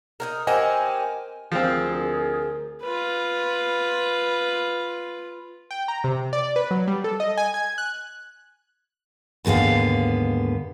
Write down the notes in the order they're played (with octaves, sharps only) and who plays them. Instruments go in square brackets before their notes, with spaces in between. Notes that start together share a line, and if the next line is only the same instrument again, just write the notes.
[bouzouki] D#4 F4 A#4
[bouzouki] C4 G4 [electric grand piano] A#4 D#5 F#5 [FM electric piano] G#5
[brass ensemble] D2 A#4 [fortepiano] F3 C4 [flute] G#4
[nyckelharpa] F4 B4
[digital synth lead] G5
A#5
C3
D5
B4
F#3
G3
A4
D#5
G#5
G#6
F#6
[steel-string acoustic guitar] D#2 G#2 D3 B3 F5